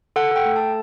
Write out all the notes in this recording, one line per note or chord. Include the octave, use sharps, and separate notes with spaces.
A4 F#5
A4 G5
A3
A5
A4